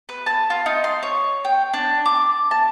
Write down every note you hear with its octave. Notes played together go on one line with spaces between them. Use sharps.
B4
A5
F4
D#4
C6
C#5
G5
D4
D6
A5